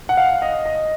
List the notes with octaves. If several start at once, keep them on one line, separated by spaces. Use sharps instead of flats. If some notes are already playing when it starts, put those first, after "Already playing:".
F#5
F5
D#5
D#5